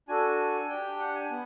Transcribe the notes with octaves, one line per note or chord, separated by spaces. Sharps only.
D4 F#4 A4 G#5
D4 G4 G5
F#5
G#5
B3